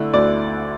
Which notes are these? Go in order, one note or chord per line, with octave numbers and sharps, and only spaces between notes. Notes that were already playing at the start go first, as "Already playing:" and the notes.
Already playing: D3 A3 E4
D2 D5